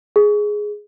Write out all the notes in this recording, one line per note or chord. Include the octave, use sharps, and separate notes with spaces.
G#4